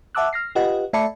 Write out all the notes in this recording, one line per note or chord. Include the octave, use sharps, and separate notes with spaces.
E5 F#5 A5 D6 E6 F#6
F6 A#6 C7
F4 G4 B4 D#5 F#5
A3 D5 E5 A5 B5 C#7